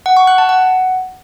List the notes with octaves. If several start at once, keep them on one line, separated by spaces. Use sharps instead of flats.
F#5
C#6
F#6
A5
F#5